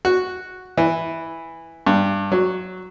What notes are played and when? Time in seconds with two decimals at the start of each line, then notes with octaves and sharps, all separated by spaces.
0.05 F#4
0.77 E3
1.87 G2
2.32 F#3